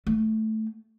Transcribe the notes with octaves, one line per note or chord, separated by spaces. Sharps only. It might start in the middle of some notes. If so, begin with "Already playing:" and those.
A3